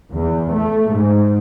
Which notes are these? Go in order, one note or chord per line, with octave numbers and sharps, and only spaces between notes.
E2
A3
G#2